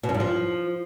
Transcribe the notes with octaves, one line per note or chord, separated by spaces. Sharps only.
B2
F#2
G2
F3